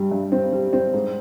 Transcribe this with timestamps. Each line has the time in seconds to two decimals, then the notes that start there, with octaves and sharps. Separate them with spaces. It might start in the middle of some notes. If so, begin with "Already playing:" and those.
Already playing: G2 G3
0.11 G2
0.32 C4
0.52 G3
0.73 C4
0.94 G#2